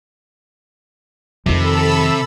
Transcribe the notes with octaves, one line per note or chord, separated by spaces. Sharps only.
F2 C3 D#3 A4 B5 E6